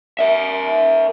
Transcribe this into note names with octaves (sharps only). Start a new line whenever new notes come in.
A#4 E5